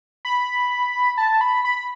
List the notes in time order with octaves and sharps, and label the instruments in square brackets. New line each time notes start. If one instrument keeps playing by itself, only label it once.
[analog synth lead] B5
A5
B5
B5